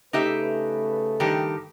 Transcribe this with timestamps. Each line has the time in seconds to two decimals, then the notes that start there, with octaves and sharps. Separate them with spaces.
0.13 C#3 A3 D#4 G4 B4 E5
1.20 G2 D#3 G4